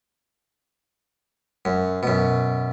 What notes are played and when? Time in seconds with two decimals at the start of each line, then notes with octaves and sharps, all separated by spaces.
1.65 F#2
2.03 F#2 B2